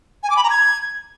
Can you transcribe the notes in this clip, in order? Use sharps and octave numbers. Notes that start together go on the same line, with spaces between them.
G#5
D6
B5
A#5
G#6